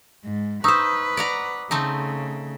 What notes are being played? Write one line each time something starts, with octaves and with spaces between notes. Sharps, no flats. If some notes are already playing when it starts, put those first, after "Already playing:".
G#2
D#4 B4 C5 C#6 D#6 E6
D5 F#5 A#5
C#3 A3 C4 D#4